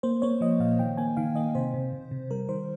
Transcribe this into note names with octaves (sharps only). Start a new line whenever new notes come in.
A#3 C5
A#3 C#5
F3 D#5
A#2 F5
D#3 G5
A#3 G#5
D#3 F5
A#3 D#5
C3 C5
C3
C3
C3
G3 A#4
D#3 C5